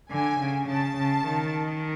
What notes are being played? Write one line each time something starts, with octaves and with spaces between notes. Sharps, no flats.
D3 G#5
C#3
C#3 A5
C#3
D#3